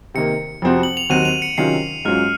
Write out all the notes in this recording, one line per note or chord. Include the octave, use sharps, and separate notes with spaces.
C3 D#3 A#3 C#7
F2 C3 F3 C4 F#4
F#7
F7
D#2 D#3 F#3 C4 F#4 D#7
F7
C#7
C3 D#3 F#3 C#4 F4 C7
G#2 F#3 C#4 F4 F6